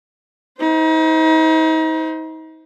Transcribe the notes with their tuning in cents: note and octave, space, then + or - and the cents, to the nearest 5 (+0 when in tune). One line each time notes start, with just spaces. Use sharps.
D#4 +40 C5 -15